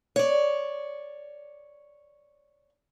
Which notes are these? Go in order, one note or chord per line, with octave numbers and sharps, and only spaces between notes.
C#5 D5